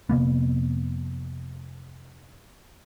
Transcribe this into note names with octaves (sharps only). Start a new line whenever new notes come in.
F1 C3 A#3 B3